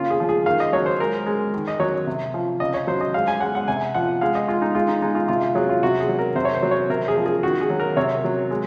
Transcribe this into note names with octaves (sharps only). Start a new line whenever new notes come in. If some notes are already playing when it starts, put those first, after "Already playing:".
Already playing: C#3 A#3 F4
G#4
F3
G#4
D#3 F5
D#5
F#3 C#5
C5
G#3 A#4
G#3
D#3
D#5
F#3 C#5
C3
F3
C#3 D#5
C#5
F#3 C5
D#5
G#3 F5
G#5
G#3 F#5
F#5
C3 G#5
F3 F#5
G#3 F5
D#5
G#3 F4
D#4
G#3 F4
D#4
G#3 D#4
F4
C3 F4
F4
F#3 G#4
F4
C3 F#4
G#4
F#3
A#4
C3 C5
C#5
C5
F#3
C#5
C3 A#4
G#4
F3
G#4
D#3 F#4
G#4
F#3
A#4
C3 C#5
F#3
G#3